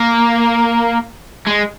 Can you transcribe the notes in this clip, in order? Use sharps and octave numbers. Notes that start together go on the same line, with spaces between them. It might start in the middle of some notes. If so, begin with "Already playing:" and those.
Already playing: A#3
G#3